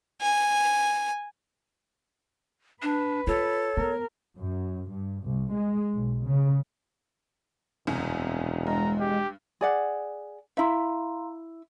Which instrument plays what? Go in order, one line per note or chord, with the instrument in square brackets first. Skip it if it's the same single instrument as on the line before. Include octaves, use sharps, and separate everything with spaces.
[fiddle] G#5
[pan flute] D4 [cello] B4
[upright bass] F4 [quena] A4 [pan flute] C#5
[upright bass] B3 [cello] A#4
[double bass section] F#2
G2
C2
G#3
B1
C#3
[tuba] E1 [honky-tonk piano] C2 F#2 C3
[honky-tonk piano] G2 [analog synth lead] G#3 [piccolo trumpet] A#5
[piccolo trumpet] G4
[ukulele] G#4 D5 F#5
[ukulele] E4 E5 [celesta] F5 A#5 C6